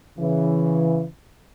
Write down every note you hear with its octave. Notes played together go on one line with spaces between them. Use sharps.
C#3 E3